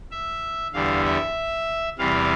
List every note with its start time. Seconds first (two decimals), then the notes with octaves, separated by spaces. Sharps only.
0.11 E5
0.74 E2 D3 G3 F5
1.05 E5
1.98 E2 C3 E3 G3 F5